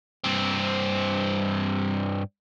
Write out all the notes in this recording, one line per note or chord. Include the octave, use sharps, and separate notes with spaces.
G2 C4